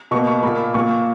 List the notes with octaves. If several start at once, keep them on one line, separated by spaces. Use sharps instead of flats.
B2 A#3 C#6
C#6
A#2 A#3 B5
A#2 A#3 C#6